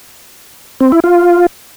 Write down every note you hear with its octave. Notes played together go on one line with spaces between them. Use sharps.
C4
E4
F4